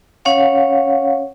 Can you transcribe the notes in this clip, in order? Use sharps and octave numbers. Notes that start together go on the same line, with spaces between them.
C#4 C#5 F5 F#5